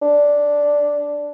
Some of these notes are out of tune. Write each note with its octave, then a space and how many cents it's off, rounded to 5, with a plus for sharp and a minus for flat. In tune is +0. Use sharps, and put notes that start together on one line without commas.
D4 -5